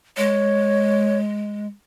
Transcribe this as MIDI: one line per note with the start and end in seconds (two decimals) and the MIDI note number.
0.17 1.67 56
0.17 1.19 73